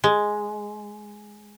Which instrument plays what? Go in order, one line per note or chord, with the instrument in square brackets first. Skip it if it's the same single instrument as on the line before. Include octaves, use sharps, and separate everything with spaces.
[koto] G#3